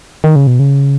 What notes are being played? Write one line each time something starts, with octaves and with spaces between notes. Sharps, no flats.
D#3
C#3
B2
C#3